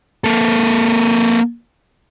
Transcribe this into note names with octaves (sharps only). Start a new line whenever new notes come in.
A#3 A4